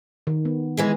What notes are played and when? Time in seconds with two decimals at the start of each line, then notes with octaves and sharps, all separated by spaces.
0.27 D#3
0.45 B3
0.77 E3 G#3 G#4